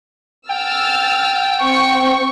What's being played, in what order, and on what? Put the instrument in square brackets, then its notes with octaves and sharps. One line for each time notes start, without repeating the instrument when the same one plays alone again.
[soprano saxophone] G5 [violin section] E6 F6 A6
[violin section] C4 C#6